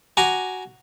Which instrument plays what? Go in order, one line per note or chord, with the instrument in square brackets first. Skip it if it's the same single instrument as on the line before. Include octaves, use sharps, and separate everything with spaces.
[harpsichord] F#4 G#5 A#5 D6